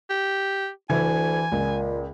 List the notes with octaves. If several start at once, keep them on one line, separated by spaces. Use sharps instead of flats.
G4
D2 E3 G#5 G#6
C#2 A#2